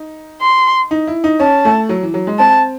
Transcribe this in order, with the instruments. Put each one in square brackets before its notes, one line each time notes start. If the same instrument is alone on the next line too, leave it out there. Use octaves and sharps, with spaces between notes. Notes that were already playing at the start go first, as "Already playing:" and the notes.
Already playing: [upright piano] D#4
[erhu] C6
[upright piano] D#4
E4
D#4
[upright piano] C#4 [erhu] A5
[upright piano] A3
F#3
E3
F#3
G#3
[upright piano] C4 [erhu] A5